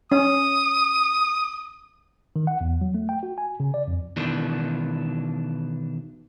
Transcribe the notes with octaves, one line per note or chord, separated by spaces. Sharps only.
C#4 D#6
D#3
F#5
E2
F#3
A3
G5
F#4
G#5
C#3
D5
F2
B2 D#3 E3 D4